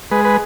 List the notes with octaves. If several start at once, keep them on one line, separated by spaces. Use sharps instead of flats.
G#3 B4
B4